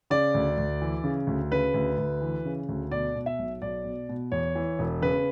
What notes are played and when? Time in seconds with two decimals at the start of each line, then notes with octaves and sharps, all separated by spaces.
0.10 C#3 D5
0.35 D2
0.58 D2
0.82 E3
1.04 C#3
1.27 D2
1.52 C#3 B4
1.74 D2
1.98 D2
2.22 E3
2.45 C#3
2.69 D2
2.91 B2 D5
3.15 B2
3.26 E5
3.39 B1
3.62 B1 D5
3.85 B2
4.09 B2
4.32 E2 C#5
4.55 E3
4.79 E1
5.02 C#3 B4